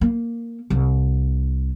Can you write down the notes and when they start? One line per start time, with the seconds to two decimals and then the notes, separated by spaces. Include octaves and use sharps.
0.01 A#3
0.70 C2